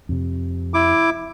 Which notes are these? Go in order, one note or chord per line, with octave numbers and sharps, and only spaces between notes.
F2 C3
E4 D6